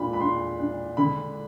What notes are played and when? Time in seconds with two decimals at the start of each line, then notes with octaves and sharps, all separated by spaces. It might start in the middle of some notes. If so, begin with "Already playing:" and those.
Already playing: A#2 D4 B5
0.13 B5
0.20 D4 C6
0.59 D4
0.97 D3 B5